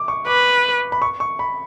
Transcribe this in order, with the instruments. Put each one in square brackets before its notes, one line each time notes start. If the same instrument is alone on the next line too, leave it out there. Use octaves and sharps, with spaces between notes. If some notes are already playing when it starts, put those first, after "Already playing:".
Already playing: [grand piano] D6
C#6
[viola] B4 [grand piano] D6
[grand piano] B5
C#6
C#6
B5